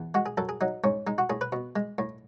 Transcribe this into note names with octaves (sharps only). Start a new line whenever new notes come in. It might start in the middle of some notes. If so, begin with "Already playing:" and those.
Already playing: E2
G#3 F#4
G#4
F#2 A4
G#4
F#3 D#4
G#2 C#4
G#3 D#4
F#4
A2 G#4
B4
B2
G#3
A2